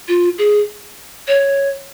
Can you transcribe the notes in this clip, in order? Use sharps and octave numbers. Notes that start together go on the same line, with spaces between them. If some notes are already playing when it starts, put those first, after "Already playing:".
F4
G#4
C#5